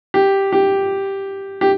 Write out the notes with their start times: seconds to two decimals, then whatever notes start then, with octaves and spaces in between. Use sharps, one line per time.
0.14 G4
0.53 G4
1.61 G4